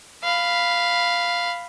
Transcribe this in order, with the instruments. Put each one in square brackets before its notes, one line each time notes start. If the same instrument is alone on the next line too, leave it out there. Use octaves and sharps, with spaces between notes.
[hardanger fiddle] F5 B5